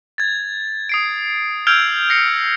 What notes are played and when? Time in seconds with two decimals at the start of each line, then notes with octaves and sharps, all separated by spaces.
0.18 G#6 A6
0.89 D#6 C7 D7
1.67 E6 F6 G6 G#6 D7 F7
2.10 A#6 C7 C#7